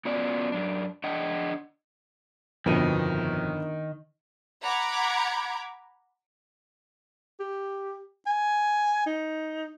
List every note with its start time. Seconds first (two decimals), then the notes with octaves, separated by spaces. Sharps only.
0.05 B3 C#4 F4 F#4 D5
0.52 F#2 D4
1.04 D4 D#5 F#5 G5
2.66 G1 F2 B2 D#3 B4 D#7
4.62 F#5 A#5 B5 D6 G#6
7.40 G4
8.27 G#5
9.06 D#4